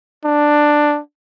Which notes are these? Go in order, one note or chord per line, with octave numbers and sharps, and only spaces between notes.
D4